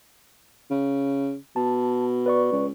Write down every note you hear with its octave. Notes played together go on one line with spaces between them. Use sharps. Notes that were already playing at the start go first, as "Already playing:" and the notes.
C#3
B2 A5
B4 D5 C#6
C#2